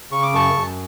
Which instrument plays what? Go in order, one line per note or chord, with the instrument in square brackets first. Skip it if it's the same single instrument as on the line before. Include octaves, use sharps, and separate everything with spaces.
[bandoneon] C#3 C#6
D6
F#2 A5 C#6
F#2